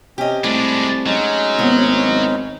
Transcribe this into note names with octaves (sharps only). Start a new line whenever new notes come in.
C3 C#4 G4 D#5
C2 G#3 A3 D4 B5 D6
F#3 G#3 C#4 D#4
G#1 D#2 B3 E4